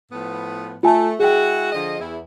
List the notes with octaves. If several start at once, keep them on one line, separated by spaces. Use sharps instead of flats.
A2 F3 B3
A3 F4 G#5 A5
G#3 E4 F#4 G#4 G5
D3 F3 D#5
E2 E4